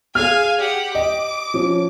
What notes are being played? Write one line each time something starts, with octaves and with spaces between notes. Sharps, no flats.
G#4 F5 G#5 F6
G4 F#5
D#5 D6
F3 C#4